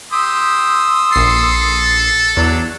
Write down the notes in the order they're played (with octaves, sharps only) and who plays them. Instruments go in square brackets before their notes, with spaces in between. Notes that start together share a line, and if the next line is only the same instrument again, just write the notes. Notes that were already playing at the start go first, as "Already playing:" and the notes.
[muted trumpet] G4 [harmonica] C6 D#6 E6
[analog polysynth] A#1 C7 [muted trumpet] A4
[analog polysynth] E2 [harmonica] F#3 D4